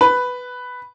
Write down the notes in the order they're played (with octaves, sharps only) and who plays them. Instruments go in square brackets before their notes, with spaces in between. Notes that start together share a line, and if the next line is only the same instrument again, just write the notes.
[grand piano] B4